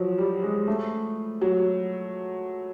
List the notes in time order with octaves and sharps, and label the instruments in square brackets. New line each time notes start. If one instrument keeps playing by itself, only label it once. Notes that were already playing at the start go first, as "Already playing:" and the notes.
Already playing: [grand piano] F3 F#3
G3
G#3
A3
F#3